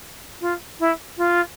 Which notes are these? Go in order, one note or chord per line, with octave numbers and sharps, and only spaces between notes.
F4
E4
F4